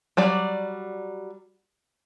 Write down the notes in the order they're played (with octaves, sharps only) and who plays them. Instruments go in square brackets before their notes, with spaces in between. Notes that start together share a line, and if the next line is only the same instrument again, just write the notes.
[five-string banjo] F#3 G3 D5